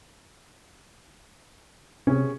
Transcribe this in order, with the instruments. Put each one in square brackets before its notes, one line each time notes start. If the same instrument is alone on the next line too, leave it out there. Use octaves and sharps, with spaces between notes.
[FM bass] C3 [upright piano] C#4 G#4